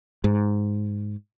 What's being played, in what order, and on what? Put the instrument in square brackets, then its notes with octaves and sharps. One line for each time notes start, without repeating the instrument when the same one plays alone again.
[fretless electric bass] G#2